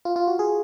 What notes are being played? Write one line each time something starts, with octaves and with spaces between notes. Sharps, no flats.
F4
F4
F#4
G#4